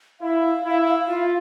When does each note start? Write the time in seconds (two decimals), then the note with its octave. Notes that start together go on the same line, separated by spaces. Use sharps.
0.20 E4 F5
0.64 E4
1.08 F4